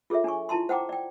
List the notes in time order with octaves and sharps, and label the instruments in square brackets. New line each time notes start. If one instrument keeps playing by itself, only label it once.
[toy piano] F4 G#4 A4 C#5 E5
D4 C#5 G#5 C#6
E4 F4 A5 A#5 C6
C5 F#5 G5 A#5 D6
D5 G5